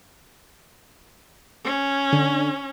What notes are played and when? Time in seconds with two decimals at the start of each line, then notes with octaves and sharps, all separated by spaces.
1.64 C#4
2.12 D3